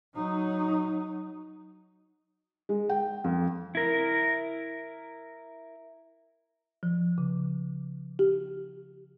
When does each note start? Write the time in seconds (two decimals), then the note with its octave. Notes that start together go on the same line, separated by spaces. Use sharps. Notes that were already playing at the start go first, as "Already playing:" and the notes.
0.15 F#3 D#4
2.69 G#3
2.89 G5
3.24 F2
3.75 E4 A#4
6.83 F3
7.18 C#3
8.19 G4